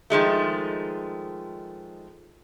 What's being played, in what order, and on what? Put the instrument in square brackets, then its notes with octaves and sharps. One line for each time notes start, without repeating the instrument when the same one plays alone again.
[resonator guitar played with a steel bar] D#3 F3 G#3 A3